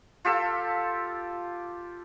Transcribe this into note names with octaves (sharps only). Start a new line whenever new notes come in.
F4 G4 A4 E6